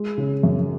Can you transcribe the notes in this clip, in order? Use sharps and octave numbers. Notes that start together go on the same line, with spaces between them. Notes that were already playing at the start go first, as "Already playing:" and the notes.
Already playing: G#3
C#3
F#2